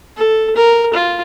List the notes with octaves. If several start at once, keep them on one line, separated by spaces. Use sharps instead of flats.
A4
A#4
F4